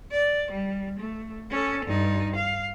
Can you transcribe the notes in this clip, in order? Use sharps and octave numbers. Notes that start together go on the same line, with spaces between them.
D5
G3
A3
C#4 A4
G2 D#4
F5